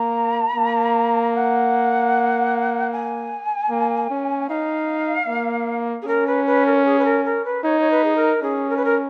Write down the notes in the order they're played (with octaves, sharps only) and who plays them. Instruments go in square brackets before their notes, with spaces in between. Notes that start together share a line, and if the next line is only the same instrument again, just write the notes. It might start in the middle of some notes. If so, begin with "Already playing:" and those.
Already playing: [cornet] A#3 [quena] A#5
[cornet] A#3
[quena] F#5
G#5
[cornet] A#3
C#4
[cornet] D#4 [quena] F5
[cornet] A#3
[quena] G#4
[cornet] C#4 [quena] A#4
[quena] B4
B4
A#4
G#4
B4
A#4
A#4
B4
[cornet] D#4 [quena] C#5
[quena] C#5
B4
G#4
A#4
[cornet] C#4 [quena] G#4
[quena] A#4
B4
A#4